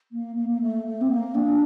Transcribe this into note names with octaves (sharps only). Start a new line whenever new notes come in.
A#3
A#3
A#3
A3
A3
C4
A#3
D4